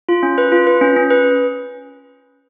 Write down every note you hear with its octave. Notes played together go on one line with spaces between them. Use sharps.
F4
C#4
B4
F4
B4
C#4
C#4
B4